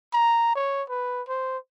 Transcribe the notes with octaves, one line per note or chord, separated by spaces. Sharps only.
A#5
C#5
B4
C5